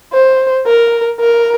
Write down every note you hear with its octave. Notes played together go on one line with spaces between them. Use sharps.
C5
A#4
A#4